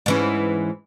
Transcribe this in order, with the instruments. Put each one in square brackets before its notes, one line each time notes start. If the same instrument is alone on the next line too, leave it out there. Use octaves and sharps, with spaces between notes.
[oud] G#2 E3 C#4